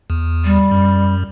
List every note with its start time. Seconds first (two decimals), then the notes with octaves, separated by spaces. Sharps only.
0.10 E2
0.45 G3
0.71 F#2